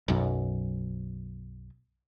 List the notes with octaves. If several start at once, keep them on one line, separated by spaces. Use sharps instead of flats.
B1 F#2